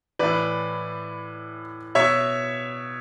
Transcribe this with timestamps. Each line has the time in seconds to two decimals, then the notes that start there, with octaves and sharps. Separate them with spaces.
0.19 A2 E3 B4 D5
1.95 B2 C#5 E5